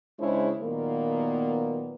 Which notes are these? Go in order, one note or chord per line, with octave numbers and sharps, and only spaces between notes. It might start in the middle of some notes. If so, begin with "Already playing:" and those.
C#3 G#3 D4 E4 C5 C#5
A#2 D#3 F#3 A#3 B3